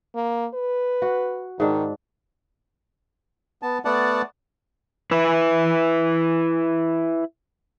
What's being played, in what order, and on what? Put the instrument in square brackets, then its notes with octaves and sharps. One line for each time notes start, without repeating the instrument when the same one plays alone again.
[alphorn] A#3
B4
[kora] F#4
[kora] G#2 D4 [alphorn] D#3
[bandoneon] B3 A5
A3 B3 D5 F#5 A5
[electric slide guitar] E4 B4